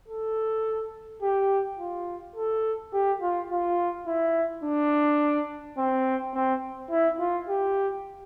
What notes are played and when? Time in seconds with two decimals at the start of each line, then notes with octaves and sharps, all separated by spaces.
0.08 A4
1.22 G4
1.79 F4
2.36 A4
2.93 G4
3.21 F4
3.50 F4
4.07 E4
4.64 D4
5.78 C4
6.34 C4
6.91 E4
7.19 F4
7.48 G4